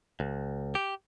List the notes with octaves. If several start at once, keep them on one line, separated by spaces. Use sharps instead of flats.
C#2
G4